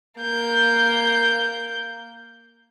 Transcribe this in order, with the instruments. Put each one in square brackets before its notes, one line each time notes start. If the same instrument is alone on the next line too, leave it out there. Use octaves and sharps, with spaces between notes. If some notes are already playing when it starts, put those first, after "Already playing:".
[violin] A#3 G6